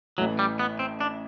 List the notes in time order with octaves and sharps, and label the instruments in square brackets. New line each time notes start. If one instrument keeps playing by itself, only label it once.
[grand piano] A1 A2 E3 A3 [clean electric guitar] F#3
[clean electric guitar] G3
B3
C4
D4